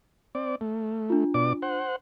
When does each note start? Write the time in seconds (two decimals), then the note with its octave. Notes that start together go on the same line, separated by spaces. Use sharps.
0.35 C4 D5
0.61 A3
1.10 D4 F4
1.34 B2 D5 D6
1.62 C5 F#5